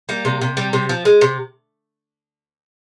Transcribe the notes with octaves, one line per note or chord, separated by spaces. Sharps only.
G3 A#3
C3
C3
G3
C3
F3
G#3
C3